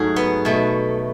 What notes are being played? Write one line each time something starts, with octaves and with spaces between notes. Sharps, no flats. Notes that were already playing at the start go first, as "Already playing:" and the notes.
Already playing: G#2 F#3 A3 F#4 G#4
B3
B2 A3